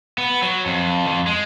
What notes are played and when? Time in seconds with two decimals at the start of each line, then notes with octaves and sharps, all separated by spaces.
0.18 B3
0.42 F#3
0.66 F2
1.07 F2
1.27 G#3